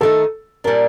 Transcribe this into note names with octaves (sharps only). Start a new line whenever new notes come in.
D#3 A3 D#4 A4
A#2 G3 D4 A#4